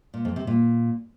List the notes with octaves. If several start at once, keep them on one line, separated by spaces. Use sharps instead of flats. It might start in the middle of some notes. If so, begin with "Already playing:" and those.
A#2
F2
C3
A#2